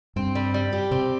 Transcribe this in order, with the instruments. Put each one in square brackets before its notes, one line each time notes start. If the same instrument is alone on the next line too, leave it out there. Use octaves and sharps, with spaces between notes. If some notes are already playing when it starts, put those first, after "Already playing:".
[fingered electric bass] G2 [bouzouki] C4
[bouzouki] G3
G3
G4
[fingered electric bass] C3 [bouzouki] C4